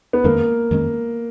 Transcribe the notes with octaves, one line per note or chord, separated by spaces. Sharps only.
B3
F2 D#3 G#3 A#3 C#4
F2 D#3 G#3 C#4